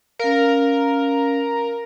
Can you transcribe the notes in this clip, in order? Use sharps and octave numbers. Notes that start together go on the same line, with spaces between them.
C#4 A#4 F5